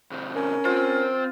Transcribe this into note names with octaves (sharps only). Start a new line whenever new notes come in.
C3 D#3
C#4 A#4
C4 F4 C5